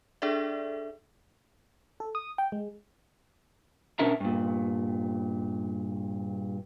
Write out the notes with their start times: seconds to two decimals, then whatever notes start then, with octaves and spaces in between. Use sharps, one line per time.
0.22 D4 G#4 A4 D5 E5
2.00 A4
2.15 D#6
2.38 G5
2.52 G#3
3.99 B2 C#4 D4 A#4 E5 A#5
4.20 G2 A#2